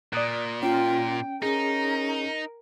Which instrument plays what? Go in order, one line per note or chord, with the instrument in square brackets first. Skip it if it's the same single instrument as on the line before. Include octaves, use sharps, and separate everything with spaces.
[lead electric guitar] A#2 [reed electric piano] D5 D#6 F#6
[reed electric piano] C#4 [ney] F4 [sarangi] G5
[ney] C#4 [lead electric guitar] D#4 [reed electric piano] G#4 [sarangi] A#4